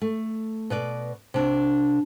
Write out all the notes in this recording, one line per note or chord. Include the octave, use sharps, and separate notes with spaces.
A3
B2 B4 D5
C3 D4